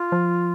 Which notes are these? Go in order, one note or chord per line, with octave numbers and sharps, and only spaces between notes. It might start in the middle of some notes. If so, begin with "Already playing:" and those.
Already playing: F4
F3